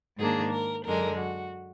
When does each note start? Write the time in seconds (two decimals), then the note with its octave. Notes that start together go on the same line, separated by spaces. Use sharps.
0.18 G#2 D#3 A#3 D4 G#4
0.52 A#4
0.85 F#2 D3 G#3 A#4
1.19 F#4